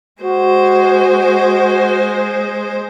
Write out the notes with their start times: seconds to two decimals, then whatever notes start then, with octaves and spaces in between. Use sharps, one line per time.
0.22 G#3 F#4 C5